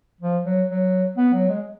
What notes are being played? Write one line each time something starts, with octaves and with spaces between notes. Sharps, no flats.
F3
F#3
F#3
B3
F#3
G#3